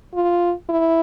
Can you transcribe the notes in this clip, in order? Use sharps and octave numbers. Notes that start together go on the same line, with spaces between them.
F4
E4